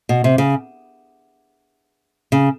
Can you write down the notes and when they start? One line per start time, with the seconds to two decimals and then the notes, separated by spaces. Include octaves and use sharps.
0.09 B2
0.24 C3
0.38 C#3
2.32 C#3